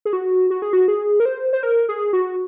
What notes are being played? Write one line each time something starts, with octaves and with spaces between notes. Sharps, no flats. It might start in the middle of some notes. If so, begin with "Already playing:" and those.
G#4
F#4
F#4
G#4
F#4
G#4
A#4
C5
C5
A#4
G#4
F#4